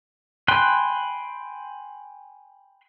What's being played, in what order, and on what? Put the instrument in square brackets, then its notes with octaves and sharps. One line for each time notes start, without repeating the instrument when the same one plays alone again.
[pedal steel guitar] G5 G#5 B5 C6 F#6